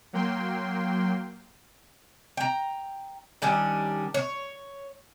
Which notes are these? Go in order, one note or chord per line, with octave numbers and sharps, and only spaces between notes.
F#3 A#3 G5 C6
G5 A#5
D#3 G3 C#4 D4
C#5